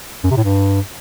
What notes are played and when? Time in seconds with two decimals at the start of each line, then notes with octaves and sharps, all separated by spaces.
0.24 F#2
0.30 C3
0.37 A2
0.44 G2